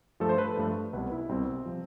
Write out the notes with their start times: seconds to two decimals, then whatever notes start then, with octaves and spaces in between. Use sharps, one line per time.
0.20 G2 F3 A3 A4
0.29 C5
0.38 B4
0.48 A4
0.57 G2 F3 A3
0.93 C2 B2 G3 B4
1.12 E4
1.29 C2 B2 G3 C4
1.66 C3 F3